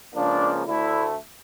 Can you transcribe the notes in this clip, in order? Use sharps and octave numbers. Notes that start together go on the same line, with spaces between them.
C#2 C#3 F3 A#3 D4
D2 D3 A3 E4